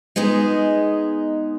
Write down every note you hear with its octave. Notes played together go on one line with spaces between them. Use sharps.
G#3 B3 D#4 G#4